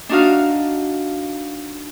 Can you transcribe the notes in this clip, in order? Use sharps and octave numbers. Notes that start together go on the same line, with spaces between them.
D4 D#4 F#4 F5